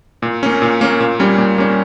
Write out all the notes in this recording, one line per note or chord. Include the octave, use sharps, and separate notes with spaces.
A#2
A#3 C#4
A#2
A#3 C#4
A#2
G3 A#3 C#4
A#2
G3 A#3 C#4